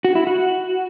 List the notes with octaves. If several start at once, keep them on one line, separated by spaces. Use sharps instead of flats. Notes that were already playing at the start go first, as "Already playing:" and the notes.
F#4
E4
F#4